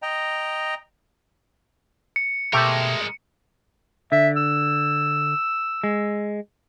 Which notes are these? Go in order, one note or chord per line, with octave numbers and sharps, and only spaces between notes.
D#5 G5 A#5
C#7
B2 G#3 A3 G4 A#4 C6
D3 E5
E6
G#3